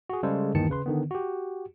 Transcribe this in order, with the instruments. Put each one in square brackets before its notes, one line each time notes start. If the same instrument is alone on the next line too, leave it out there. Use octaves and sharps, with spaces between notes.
[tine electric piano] F#4 G#4
C#3 G3 G#3 A4 C5
G1 D#2 D#3 E3 A5 C#7
C#3 B4 C6
D3 D#3 B3
F#4 G4